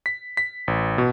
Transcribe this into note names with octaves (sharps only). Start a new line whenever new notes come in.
B6
B6
A1
B2